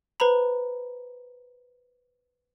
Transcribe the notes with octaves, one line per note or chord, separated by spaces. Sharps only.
B4 C5 A#5 B5